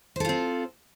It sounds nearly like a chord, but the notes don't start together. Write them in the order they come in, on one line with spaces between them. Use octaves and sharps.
C5 A4 F4 C4